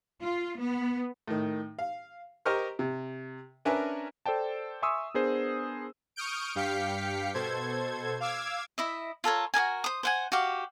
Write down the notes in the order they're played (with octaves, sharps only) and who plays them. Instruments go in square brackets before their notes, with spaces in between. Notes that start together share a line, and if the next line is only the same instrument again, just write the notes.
[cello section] F4
B3
[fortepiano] A2 D#3
F5
G4 A#4 C5 D#5 C#6 F6
C3
C#4 D4 A#4 B4 E5 G#5
[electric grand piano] A4 C5 D5 G5 A5
E5 G#5 C6 C#6 D#6 E6
B3 D4 G#4 A#4 C5
[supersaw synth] C#6 D#6 F6 G6 D7
G2 G4 F5 G5 B6 C#7
B2 A4 C5 G#6
F5 D6 E6 G#6
[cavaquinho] E4 D#5 E5
F4 A4 A#4 C#5
F#4 G#4 A#4 G#5
C5 D#6
C5 F#5 G#5
F#4 G4 F5